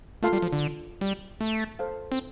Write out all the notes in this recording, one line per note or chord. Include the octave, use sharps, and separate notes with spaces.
A3 F4 A4 F5 C6
G3
F3
D3
G3
A3
A4 C5 F5
C4